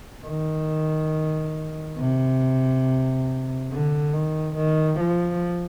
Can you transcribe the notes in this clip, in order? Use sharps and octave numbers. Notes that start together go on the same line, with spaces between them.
D#3
C3
D3
D#3
D#3
F3